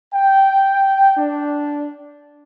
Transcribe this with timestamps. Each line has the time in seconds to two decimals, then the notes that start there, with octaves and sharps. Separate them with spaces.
0.14 G5
1.17 D4